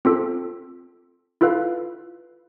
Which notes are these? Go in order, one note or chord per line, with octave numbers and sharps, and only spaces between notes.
C4 F4 A4
E4 F4 A4 B4 F5